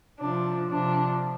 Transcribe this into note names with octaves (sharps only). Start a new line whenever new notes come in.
C3 F3 D4
C3 F3 D4